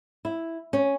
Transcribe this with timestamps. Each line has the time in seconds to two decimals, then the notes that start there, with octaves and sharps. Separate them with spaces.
0.25 E4
0.73 C#4